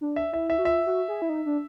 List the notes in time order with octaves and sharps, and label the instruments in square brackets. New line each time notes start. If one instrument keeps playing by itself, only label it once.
[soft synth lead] D4
[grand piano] E5
[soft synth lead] E4 [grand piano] E5
[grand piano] E5
[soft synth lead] F#4
[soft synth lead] F4 [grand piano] E5
[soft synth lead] F#4
G#4
E4
D#4
D4